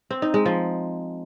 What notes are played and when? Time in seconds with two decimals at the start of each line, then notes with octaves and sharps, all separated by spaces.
0.11 C4
0.22 D#4
0.34 G#3
0.46 F3